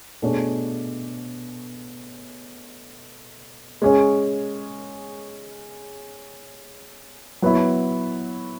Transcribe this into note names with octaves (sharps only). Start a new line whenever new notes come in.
B2 A3 D4 G#4 C#5
G#3 C#4 G#4 C#5
F#3 B3 E4